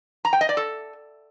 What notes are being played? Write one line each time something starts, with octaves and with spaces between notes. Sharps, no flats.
A#5
G5
D#5
D5
A4